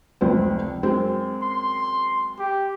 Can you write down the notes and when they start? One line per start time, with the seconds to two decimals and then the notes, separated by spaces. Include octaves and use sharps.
0.21 F1 C#2 C4
0.83 F#2 G#3 C4
1.42 C6
2.39 G4